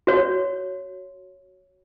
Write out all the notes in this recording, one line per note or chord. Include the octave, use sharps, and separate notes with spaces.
F#4 C#5